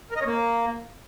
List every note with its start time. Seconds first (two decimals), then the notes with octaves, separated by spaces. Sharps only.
0.11 A#4
0.16 D#5
0.21 C#4
0.26 A#3